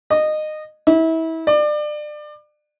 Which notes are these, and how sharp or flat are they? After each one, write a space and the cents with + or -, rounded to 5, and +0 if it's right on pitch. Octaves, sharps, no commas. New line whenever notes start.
D#5 -20
E4 -30
D5 +30